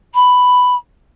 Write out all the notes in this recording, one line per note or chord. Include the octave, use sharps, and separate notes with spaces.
B5